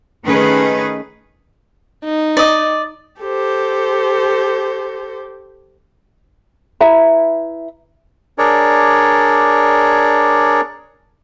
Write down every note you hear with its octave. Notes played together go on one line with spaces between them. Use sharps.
D#3 A3 C#4 D#4 G#4 B4
D#4
D5 D#5
G4 A4 C5
E4 B4 E5 A#5
D4 G#4 A#4 C#5 D5